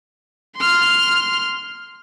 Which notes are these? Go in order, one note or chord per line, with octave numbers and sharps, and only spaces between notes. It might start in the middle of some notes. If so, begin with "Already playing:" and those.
C6 F6